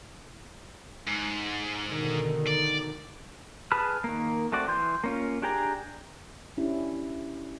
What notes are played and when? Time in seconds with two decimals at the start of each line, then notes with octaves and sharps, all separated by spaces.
1.07 G#2
1.85 B2 D3 D#3
2.48 D5
3.72 G#4 B4 A5 B5 F6
4.04 D#3 A#3
4.52 A3 C4 F#4 D5
4.68 E3 C6 G6
5.04 A#3 C#4 F4
5.42 D4 G4 G#4 G5 A#5
6.57 C#4 D4 E4 G4